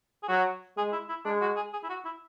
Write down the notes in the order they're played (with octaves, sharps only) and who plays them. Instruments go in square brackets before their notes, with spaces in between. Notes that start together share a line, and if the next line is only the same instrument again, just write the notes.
[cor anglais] G#4
[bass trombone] F#3 [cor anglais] F#4
[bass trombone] G#3 [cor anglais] G#4
[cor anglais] E4
E4
[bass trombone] G#3 [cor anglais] D4
[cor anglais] F#4
G#4
G#4
E4
F#4
E4